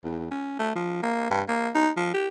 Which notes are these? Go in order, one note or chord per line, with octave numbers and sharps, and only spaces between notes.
E2
C#4
A3
F3
A#3
G2
A#3
D#4
F3
G4